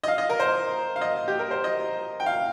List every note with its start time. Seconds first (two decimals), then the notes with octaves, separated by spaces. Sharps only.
0.04 D#5
0.08 F5
0.18 D#5
0.30 A#4
0.40 C5
0.96 F5
1.01 D#5
1.28 G4
1.39 A#4
1.51 C5
1.64 D#5
2.20 G5
2.26 F5